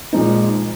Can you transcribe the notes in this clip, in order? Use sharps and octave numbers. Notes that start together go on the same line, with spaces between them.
A#2 F3 G#3 C4 D#4